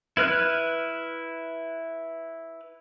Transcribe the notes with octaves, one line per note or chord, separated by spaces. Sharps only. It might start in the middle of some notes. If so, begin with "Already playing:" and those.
E4 B4 F6 F#6